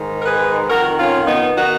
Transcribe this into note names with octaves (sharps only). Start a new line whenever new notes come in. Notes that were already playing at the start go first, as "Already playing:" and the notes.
Already playing: G#2 D#3
A#4
G#4 B4
F2 D#3 F#4 A#4
C#4 F4
B3 D#4
D#3 D#4 F#4